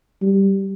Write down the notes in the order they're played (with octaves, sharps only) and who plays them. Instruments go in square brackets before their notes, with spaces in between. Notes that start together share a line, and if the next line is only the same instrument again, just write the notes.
[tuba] G3